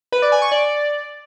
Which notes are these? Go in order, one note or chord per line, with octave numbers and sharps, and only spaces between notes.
B4
D5
G#5
C#6
D5